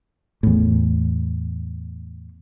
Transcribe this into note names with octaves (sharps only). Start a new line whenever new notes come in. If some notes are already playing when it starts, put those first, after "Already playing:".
E2 A2